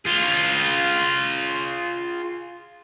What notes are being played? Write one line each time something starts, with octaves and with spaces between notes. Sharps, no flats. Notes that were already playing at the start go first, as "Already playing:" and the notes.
F4 G#4